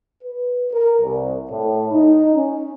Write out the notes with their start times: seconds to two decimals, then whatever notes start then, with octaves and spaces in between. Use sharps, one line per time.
0.22 B4
0.71 A#4
1.01 C2
1.50 A2
1.91 D#4
2.35 C#4